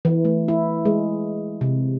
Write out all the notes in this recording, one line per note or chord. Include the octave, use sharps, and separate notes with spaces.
E3
A3
E4
G#3
C3